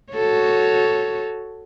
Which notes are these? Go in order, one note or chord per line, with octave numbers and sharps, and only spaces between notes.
F#4 A4 C#5